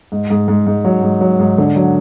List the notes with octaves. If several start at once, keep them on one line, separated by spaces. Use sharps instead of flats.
G#2
G#2
G#2
G#2
F#3
G#2
F#3
G#2
D3
F#3